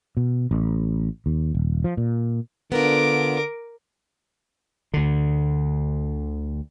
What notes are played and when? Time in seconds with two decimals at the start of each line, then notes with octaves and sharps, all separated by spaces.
0.17 B2
0.51 A1
1.26 D#2
1.55 D#1
1.84 F3
1.97 A#2
2.72 D3 B3 F4 A#4 D6
4.94 D2 D3